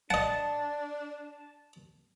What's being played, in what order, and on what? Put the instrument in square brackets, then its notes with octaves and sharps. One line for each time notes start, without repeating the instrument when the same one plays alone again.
[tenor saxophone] D4 [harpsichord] D#5 F#5 [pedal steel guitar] A5